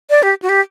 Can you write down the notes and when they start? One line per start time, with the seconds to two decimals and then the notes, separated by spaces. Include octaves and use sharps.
0.10 D5
0.23 G4
0.42 F#4
0.49 G4